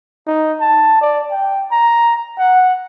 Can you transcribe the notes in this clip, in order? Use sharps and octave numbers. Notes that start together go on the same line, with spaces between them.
D#4
A5
D5
G5
A#5
F#5